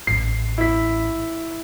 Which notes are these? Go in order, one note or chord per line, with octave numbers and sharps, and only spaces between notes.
A1 C7
E4 B6